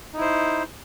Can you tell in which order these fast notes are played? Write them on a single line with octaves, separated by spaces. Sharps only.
D#4 E4 C5